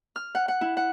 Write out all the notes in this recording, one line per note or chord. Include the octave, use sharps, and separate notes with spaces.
F6
F#5
F#5
E4
F#5